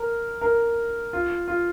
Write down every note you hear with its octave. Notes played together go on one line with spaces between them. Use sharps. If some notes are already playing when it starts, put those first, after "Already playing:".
Already playing: A#4
A#4
F4
F4